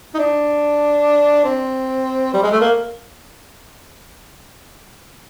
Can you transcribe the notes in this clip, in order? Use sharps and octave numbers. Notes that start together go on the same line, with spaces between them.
D#4
D4
C4
G3
G#3
A3
A#3